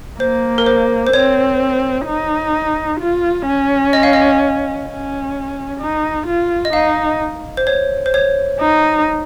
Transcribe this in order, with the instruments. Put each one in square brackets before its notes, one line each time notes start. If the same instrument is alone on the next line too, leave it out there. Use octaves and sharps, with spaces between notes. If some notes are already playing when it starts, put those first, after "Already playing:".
[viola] A#3 [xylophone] C5
[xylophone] A#4
C5
C5
[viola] C4 [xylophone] C#5
[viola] D#4
F4
C#4
[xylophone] D#5
F5
D#5
[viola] C#4
D#4
F4
[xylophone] D#5
[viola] D#4 [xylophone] F5
[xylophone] C5
C#5
C5
C#5
[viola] D#4